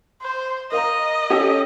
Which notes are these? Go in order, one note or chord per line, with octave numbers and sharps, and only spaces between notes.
C5
A#4 D#5 F5 A#5
C#4 G4 A4